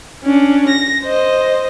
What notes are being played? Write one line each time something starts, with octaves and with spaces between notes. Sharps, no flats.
C#4 D4
A#6
C5 D#5